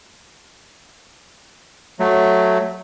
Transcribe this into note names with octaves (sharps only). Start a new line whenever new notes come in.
F#3 A3